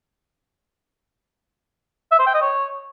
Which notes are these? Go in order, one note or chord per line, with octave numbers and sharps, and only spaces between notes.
E5
C5
G5
D#5
C#5